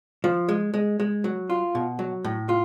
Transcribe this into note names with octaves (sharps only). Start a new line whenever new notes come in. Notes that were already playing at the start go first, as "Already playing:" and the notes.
F3
G#3
G#3
G#3
F#3
F4
B2
F#3
A2
F4